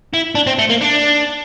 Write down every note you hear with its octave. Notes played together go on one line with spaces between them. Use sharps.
E4
D4
C4
A3
A#3
D4